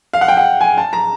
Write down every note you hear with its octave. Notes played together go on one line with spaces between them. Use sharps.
F5
F#5
G5
F#5
G#5
A5
A#5